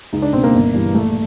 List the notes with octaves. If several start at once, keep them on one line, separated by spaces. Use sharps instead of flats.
C#2 D#4
D4
B2 C4
A#3
G1
G2 E3
A#1 A3